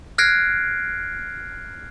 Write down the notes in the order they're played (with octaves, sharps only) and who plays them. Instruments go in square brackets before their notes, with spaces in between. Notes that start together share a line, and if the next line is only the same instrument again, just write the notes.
[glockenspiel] F6 F#6 G#6 A#6 C7 D7